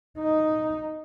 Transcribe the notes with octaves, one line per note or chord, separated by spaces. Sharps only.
D#4